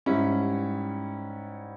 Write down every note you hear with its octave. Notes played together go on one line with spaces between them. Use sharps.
G#2 G3 C#4 E4